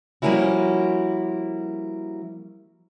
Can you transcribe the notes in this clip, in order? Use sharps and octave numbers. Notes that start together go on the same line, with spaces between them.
F3 G3 A#3 C#4 E4 F#4